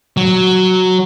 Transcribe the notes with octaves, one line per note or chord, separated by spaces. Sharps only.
F#3